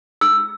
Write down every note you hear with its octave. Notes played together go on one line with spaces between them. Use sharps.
E6